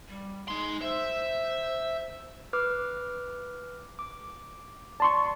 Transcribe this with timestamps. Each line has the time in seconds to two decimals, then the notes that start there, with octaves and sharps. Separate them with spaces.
0.08 G3
0.48 G#3 D#4 C6
0.81 C5 E5
2.53 B4 D6 F6
3.99 D6
5.00 D5 A5 C6 C#6